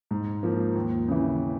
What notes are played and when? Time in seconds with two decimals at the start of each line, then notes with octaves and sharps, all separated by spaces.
0.11 G#2
0.43 F3 A#3
0.75 D#2
1.08 C#3 E3